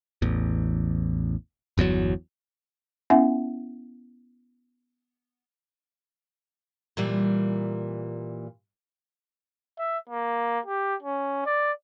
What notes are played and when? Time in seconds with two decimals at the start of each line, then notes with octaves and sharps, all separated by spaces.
0.22 A1 E2
1.78 G1 E2 A#2 F#3
3.10 B3 C#4 E4 E5 F#5 G#5
6.97 A#2 E3 G3
9.79 E5
10.09 A#3
10.66 G4
11.02 C#4
11.45 D5